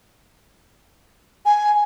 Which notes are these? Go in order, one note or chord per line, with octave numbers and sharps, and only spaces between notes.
G#5